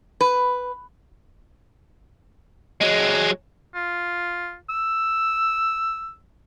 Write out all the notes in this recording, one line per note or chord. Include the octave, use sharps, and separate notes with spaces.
B4
F#3 G#3
F4
E6